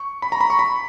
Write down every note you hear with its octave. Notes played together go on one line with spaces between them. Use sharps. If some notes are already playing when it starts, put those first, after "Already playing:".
Already playing: C#6
B5
A#5
B5
C#6
B5